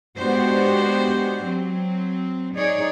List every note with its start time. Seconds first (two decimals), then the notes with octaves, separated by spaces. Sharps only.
0.18 G#3 B3 D4 F#4 G4 C5
1.46 F#3 C4
2.56 D#4 G#4 C#5 D5